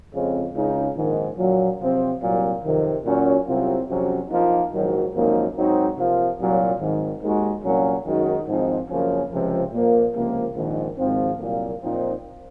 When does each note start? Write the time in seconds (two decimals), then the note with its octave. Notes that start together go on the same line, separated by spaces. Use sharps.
0.13 F2 C#3 G#3 C4
0.54 C#2 C#3 G#3 D#4
0.96 A#1 G#2 D#3
1.38 A#1 A#2 F#3
1.80 C3 F3 C4
2.22 C2 A#2 F#3
2.63 F2 C3 D#3
3.05 A#2 F#3 C#4 F#4
3.46 C2 C3 F#3 C4 F4
3.88 F2 C3 F#3 C#4 F#4
4.30 A#1 A#2 F3 A#3 D#4
4.72 A#1 G#2 D#3 F#3
5.13 G#1 F#2 F3 A#3 D#4
5.55 G#2 F#3 C4 D#4 F#4
5.97 C3 F3 A#3 F4
6.39 C2 A#2 F#3
6.80 G#1 G#2 D#3
7.22 D#2 D#3 G#3 D#4 F#4
7.63 C2 A#2 F#3 A#3 C#4
8.05 F#2 D#3 G#3 D#4 F#4
8.47 G#1 G#2 F3 C4 D#4
8.89 F#2 C#3 F3 A#3 C#4
9.31 C#2 C3 F3
9.72 A#2 F3 A#3
10.14 C#2 C3 F3 A#3
10.56 A#1 G#2 D#3
10.97 G#1 G#2 F3 C4
11.39 C2 A#2 F#3 A#3
11.82 A#2 F3 C4 D#4